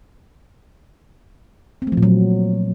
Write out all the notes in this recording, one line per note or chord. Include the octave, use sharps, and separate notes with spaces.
C4
A3
F3
A#2
F#3